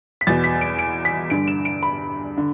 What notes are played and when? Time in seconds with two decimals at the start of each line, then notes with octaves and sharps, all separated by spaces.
0.21 B6
0.27 E2 B2 A6
0.44 B6
0.61 D7
0.79 D7
1.05 B6
1.30 G2 D3 D7
1.48 E7
1.65 D7
1.83 B5
2.38 D3